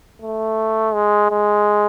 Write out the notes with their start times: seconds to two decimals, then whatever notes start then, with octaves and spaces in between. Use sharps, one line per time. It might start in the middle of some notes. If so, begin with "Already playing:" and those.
0.22 A3
0.94 G#3
1.31 G#3